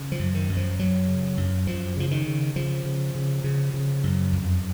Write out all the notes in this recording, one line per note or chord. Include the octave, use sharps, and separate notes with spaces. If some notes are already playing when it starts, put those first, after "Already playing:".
Already playing: C#3
F3
F#2
D#3
F#2
F3
F#2 F#3
C#3
F#2
F#2 F3
C#3 F3
D#3
C#3
C#3 F3
C#3
C#3
C#3
C#3
F#2
F2